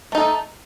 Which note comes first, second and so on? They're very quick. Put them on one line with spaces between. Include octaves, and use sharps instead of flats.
A3 D#4 A4